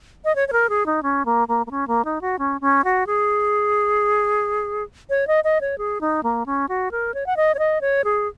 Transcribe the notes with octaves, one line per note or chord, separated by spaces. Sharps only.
D#5
C#5
C#5
A#4
G#4
D#4
C#4
A#3
A#3
A#3
C#4
A#3
D#4
F#4
C#4
C#4
F#4
G#4
C#5
D#5
D#5
C#5
G#4
D#4
A#3
C#4
F#4
A#4
C#5
F#5
D#5
C#5
D#5
C#5
G#4